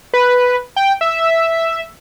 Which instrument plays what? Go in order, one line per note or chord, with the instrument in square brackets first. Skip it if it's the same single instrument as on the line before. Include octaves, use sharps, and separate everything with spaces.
[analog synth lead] B4
G5
E5